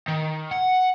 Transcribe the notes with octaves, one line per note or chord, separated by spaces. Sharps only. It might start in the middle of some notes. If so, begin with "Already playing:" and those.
D#3
F#5